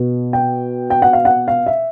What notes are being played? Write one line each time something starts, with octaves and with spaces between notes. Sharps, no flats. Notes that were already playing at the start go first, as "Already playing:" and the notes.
Already playing: B2
G5
G5
F#5
F5
F#5
F5
E5